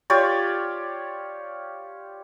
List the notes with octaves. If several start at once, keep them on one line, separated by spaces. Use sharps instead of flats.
F4 G4 C#5 D5